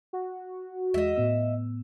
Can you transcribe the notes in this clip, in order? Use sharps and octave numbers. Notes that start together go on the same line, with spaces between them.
F#4
E2 G#3 D#5 E5 E6
A2 B3 E6